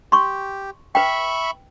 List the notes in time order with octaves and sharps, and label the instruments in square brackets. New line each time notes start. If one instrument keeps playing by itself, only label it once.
[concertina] G4 [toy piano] C6 C#6
[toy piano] B4 G5 [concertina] E5 B5 C#6